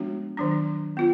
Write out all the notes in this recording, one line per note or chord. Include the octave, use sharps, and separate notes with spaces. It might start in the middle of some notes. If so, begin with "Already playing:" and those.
Already playing: F3 G#3 B3 D4 F#4
D#3 F#3 D4
B3 F4